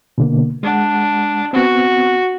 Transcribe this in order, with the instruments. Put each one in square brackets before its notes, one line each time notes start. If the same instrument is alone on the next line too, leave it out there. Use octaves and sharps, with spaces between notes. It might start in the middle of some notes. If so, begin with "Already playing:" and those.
[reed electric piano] B2 D3 A#3
[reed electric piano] G#3 F#5 [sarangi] D4
[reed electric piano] B3 C4 [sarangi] F#4